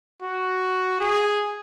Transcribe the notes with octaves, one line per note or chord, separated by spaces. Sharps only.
F#4
G#4